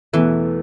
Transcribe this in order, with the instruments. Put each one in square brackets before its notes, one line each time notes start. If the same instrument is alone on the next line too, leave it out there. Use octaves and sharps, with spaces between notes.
[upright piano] E2 B2 A3 E4 [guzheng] E3